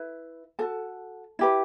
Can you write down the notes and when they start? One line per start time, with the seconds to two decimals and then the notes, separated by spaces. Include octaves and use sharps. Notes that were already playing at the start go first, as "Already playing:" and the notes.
Already playing: E4 B4
0.59 F#4 A4 A5
1.39 E4 G4 B4